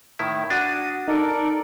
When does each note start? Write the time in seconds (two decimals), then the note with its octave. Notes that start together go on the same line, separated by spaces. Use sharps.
0.19 A2 D#3 E4
0.50 D4 F#4 D#6
1.08 D#4 A4 A#4 D5